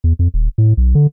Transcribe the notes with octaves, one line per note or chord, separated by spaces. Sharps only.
E2
F2
D#1
A2
B1
D3